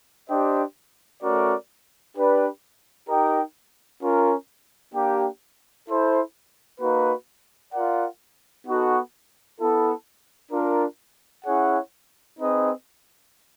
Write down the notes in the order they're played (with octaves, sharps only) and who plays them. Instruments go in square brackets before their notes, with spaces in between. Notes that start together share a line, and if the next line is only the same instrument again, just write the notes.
[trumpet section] D4 G4 C5 D#5 G5
A3 C#4 F#4 A#4 D5
D4 G4 B4 D5
D#4 G4 A#4 D#5 G5
C#4 F4 A#4
A#3 D4 G4
E4 A4 C5
A#3 D#4 F#4 B4
F4 A#4 D5 F#5
B3 D#4 F#4 A4
B3 E4 A4
D4 F4 A#4
C#4 E4 G#4 C#5 F#5
C4 D#4 G#4 B4 D#5